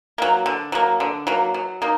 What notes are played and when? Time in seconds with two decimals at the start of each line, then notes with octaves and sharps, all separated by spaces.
0.18 F#3 A#3
0.46 D3
0.72 F#3 A#3
1.00 D3
1.27 F#3 A#3
1.54 F#3
1.82 A#3 D#4